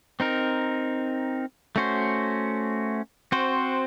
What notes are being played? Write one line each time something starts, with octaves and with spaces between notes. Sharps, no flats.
C4 D#4 A#4
A3 C#4 F#4 C5
C4 F#4 C5